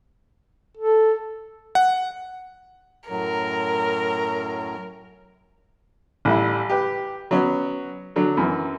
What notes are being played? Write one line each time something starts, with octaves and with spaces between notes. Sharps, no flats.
A4
F#5
F#2 A2 F#3 A#4
A1 G3 E4
G4 B4
F#3 B3 C#4
D3 F#3
F#2 E3